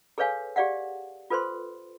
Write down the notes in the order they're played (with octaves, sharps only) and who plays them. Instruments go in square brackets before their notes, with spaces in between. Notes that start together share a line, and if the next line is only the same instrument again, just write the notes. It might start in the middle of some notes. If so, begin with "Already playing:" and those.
[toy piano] G#4 A4 B4 C#5 F5 G#5
G4 G#4 D5 F5 F#5
F4 A4 B4 C5 C6